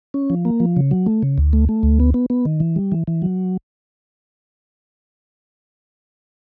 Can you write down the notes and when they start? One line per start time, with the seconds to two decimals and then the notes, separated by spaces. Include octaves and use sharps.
0.14 C#4
0.30 F3
0.45 A#3
0.60 F3
0.76 C#3
0.91 F#3
1.06 A3
1.22 C#3
1.38 D2
1.53 A3
1.69 A3
1.83 D2
2.00 B3
2.14 B3
2.30 B3
2.45 D#3
2.60 E3
2.76 G3
2.92 E3
3.07 E3
3.22 F#3